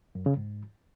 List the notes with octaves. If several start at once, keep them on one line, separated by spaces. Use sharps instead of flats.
F#2
C#3
G#2